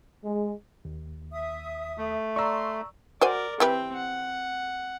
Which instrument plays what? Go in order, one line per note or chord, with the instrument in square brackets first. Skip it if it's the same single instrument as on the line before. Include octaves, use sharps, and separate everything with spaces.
[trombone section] G#3
[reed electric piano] D#2
[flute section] E5 D#6
[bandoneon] A3
[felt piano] D5 A#5 [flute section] C6 [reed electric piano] C#6 E6
[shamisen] F#4 C5 G#5 [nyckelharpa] A#4 D5
[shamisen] E3 G4 B4 [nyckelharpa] C4 G5
[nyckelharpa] F#5